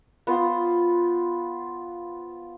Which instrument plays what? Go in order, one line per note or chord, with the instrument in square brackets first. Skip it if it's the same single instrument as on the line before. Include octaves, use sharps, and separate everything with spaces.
[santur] B3 F4 C5